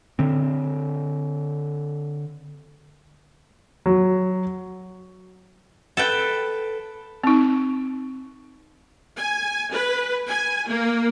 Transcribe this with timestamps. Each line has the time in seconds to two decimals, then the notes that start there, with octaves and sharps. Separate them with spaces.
0.19 D3 C4
3.86 F#3
5.97 A4 B4 G5
7.24 C4 D#4
9.16 G#5
9.72 B4
10.27 G#5
10.66 A#3